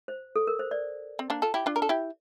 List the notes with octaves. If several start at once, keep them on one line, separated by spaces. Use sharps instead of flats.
C5
A4
A#4
C5
D5
C4
A#3 D4
F4 A4
E4 G4
D4 F4
A#4
A4
E4 G4